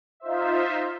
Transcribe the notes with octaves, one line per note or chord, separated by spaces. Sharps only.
D#4 F4 C5 E5